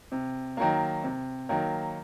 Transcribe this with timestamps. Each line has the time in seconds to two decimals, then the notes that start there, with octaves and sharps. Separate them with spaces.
0.12 C3
0.57 D#3 F#3 A#3
1.04 C3
1.49 D#3 F#3 A#3